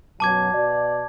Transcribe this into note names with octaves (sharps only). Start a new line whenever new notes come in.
F#2 B2 F#3 A5 D6 G#6
B2 F#4 D5